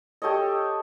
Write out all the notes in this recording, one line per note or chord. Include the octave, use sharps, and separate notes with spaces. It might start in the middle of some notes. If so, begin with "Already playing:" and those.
G4 A4 C#5 D#5